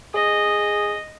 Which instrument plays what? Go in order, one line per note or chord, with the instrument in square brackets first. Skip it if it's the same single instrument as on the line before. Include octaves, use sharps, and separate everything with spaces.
[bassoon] G#4 [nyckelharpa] D#5